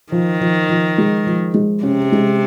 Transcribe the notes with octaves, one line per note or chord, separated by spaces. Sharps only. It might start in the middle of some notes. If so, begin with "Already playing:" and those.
D#3 F3
F3
F3
G#3
F3
G#3
C3 C#4
G#3